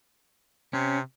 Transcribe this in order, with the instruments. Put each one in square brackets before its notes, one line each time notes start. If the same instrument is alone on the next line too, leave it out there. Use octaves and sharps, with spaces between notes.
[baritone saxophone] C3 [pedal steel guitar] C#4